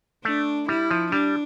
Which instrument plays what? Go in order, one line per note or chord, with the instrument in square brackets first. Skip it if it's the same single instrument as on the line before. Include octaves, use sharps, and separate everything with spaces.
[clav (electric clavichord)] A3 [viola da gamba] D4
[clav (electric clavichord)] G3 [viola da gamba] E4
[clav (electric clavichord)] F3
[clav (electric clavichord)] G3 [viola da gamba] D4